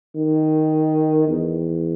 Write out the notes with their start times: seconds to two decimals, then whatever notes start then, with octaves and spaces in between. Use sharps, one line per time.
0.17 D#3
1.29 E2